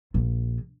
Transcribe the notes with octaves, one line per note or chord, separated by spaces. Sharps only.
A#1